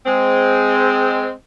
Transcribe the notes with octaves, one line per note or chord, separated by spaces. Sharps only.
G#3 C4